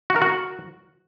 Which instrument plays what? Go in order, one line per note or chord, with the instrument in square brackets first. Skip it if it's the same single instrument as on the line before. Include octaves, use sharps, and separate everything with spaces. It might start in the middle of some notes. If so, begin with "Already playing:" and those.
[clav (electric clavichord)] F#4
A#4
F#4